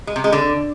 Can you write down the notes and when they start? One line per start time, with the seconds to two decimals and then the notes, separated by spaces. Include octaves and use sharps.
0.07 G#3
0.16 C3
0.24 G#3
0.32 D3